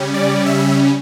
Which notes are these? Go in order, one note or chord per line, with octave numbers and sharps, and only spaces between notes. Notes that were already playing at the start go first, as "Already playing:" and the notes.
Already playing: C#3 G3 C#4
D5
E5